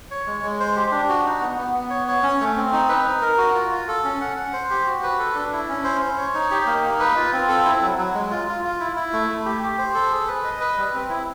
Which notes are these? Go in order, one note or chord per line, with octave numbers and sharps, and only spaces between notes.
C#5
G#3
G#3
C5
G4
D4
F#4
D#4
B3
B3
B3
C#5
C#5
C#4
A3
C4
D#4
B4
D#4
A#4
F#4
F4
F4
A4
C#4
F#5
F#5
C5
G4
F#4
B4
A4
D4
E4
C#4
C5
C5
C#5
D#4
G4
A#3
D#4
B4
F4
C4
A4
E4
F#3
F#3
G#3
F4
F4
F4
E4
E4
A3
A3
G4
G4
C5
A4
G#4
B4
D#5
B4
G3
C4
E4